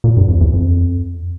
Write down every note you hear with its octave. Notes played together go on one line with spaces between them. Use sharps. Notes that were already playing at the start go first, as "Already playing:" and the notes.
A#2
G2
F2
E2
F2